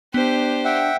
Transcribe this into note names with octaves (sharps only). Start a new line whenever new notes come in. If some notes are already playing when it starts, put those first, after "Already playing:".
B3 D4 G4 C5
E5 F#5 G5